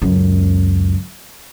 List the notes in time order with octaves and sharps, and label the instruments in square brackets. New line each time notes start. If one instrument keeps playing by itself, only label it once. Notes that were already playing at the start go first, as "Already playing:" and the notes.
[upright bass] C#2 F#2